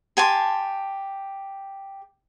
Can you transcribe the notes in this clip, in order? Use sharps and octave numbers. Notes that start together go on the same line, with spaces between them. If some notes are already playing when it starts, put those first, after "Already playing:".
G4 G#5 A5 C6